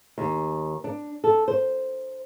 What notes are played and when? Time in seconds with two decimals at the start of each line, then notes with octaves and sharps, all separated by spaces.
0.18 D#2
0.84 D4
1.24 A4
1.48 C5